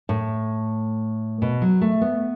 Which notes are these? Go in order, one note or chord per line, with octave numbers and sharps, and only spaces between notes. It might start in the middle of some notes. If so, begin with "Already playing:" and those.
A2
B2
F#3
A3
B3